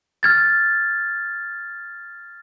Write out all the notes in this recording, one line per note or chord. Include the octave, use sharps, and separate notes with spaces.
F6 G#6 A6